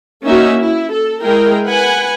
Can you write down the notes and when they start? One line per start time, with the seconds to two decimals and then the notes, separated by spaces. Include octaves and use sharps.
0.24 A#3 C#4 D#4 F#4 E5
0.60 E4
0.92 A4
1.23 G#3 E4 G#4 A#4 G5
1.65 B4 F#5 G#5